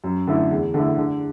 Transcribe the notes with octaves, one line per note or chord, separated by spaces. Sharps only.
F#2
D3 A3 E4
E2
D3 A3 E4
D3